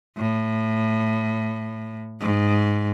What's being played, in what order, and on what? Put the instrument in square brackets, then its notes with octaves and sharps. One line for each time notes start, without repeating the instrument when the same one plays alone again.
[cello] A2
G#2